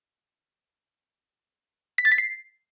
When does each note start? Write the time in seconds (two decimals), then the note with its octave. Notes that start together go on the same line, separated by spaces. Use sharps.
1.98 B6
2.05 A6
2.12 B6
2.18 C7